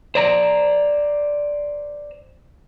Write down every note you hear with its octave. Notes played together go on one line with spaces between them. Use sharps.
C5 D5 A#5